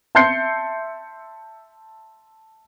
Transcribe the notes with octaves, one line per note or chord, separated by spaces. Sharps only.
E5 A5 C6 G6 C7 C#7